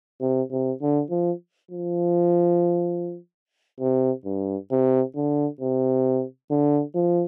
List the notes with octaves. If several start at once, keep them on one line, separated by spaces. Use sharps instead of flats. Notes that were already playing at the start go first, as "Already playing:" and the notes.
C3
C3
D3
F3
F3
C3
G2
C3
D3
C3
D3
F3